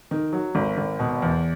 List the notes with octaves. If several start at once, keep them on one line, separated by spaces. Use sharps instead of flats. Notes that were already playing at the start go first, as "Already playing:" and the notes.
D#3
F#3
G#1
G#1
B2
E2